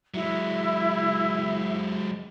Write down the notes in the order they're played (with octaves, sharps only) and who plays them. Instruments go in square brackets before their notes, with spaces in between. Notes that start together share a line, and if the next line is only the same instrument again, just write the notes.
[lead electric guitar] F#3 G#3 [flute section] E4 E5